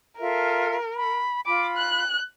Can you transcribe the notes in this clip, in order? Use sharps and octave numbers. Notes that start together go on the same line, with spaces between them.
F4 A4 A#4 E5
B5
F4 B5 D6
F#6